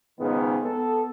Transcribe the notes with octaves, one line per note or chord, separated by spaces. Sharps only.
C#2 G#2 B2 D#3 B3
B3 A4